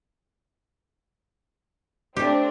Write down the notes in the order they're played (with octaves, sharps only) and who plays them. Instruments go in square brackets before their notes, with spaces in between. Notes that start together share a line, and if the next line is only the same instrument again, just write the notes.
[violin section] A3 C4 D4 [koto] G4